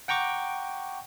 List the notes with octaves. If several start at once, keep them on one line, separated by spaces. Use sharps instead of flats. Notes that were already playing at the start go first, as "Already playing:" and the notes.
F#5 G5 A#5 C#6 D6